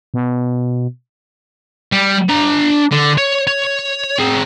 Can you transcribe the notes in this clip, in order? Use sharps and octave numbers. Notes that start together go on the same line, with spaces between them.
B2
G3
D4 A#5
D3
C#5
C#5
C4 G#4